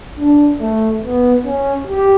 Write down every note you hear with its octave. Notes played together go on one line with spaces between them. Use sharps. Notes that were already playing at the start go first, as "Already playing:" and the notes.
D4
A3
B3
C#4
G4